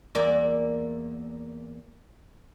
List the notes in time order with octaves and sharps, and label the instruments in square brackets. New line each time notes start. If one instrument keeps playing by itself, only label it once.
[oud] E2 A#3 D5